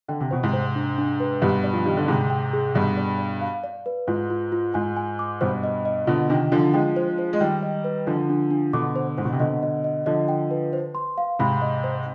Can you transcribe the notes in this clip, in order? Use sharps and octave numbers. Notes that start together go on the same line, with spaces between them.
D3 G5
C3
B2 C5
G#2 C3
C5
D4
D4
B4
G2 B2 G4
D5
F3
D#3 G4
D3
G#2 C3 G#4
G5
G#4
G2 B2 D5
D5
D5
F5
D5
B4
G#2 F4
F4
F4
G#2 G#5
G#5
D6
G2 B2 C5
D#5
D#5
B2 D3 F4
C3 D#3 D4
D3 F3 D4
F3 G#3 G5
C5
C5
G#3
D#3 G3 G5
D#5
B4
D3 F3 D4
D4
D4
B2 D3 D6
C5
G#2 C5
B2
C3
B2 D3 D#5
D#5
D#5
D3 F3 D#5
G5
B4
C5
C6
F5
G#2 C3 B5
D#5
C5